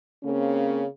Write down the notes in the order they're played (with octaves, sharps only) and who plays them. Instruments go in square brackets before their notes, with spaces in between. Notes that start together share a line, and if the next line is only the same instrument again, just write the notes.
[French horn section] C#3 A#3 C4 C#4